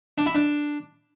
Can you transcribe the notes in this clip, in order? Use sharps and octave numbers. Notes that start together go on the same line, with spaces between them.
D4
E4
D4